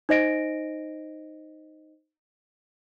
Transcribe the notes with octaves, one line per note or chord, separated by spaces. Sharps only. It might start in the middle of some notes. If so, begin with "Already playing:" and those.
D#4 C5 D#5 A#6 D7